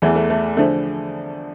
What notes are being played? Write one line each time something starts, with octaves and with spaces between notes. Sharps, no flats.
E2 E3 A3
A3
A3
D3 F3 A3